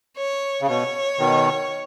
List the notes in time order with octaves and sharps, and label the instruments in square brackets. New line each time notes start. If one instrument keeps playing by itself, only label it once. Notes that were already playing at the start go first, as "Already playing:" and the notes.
[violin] C#5
[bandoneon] C#3
[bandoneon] B2 [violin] C#5
[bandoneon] B2 D#3